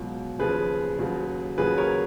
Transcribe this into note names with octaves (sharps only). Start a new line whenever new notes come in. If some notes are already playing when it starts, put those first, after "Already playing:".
Already playing: C#2 B2 F#3
D#2 C#3 F3 G#4 B4
D#2 C#3 F#3
D#2 C#3 F#3 G#4 B4
A#4 C#5